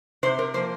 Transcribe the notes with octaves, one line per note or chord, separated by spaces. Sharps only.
C3 C5
A#4
F3 A#3 C5